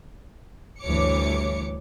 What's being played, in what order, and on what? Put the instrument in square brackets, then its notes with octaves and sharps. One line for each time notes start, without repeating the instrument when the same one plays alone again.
[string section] D2 G2 E3 C#5 D6 C#7